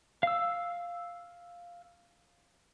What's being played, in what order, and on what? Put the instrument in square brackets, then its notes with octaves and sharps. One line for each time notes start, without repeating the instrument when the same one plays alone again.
[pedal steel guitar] F5 E6